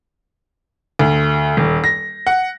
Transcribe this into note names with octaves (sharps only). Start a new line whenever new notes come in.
D2
D#1
A#6
F#5